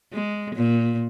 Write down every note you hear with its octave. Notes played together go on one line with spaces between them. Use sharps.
G#3
A#2